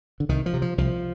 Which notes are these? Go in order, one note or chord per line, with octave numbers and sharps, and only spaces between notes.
D3
C2 D#3
F3
C3
F3
C2 F3